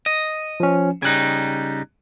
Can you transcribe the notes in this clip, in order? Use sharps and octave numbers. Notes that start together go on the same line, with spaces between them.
D#5
F3 C#4
C#3 G3 D#4 F#6 G#6